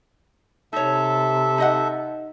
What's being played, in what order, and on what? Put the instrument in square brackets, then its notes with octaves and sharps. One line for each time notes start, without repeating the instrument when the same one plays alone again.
[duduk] C3 [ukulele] D#4 C#5 [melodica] A4 E5
[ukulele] D#4 D#5 F#5